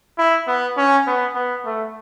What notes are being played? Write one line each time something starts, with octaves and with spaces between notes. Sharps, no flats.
E4
B3
C#4
B3
B3
A3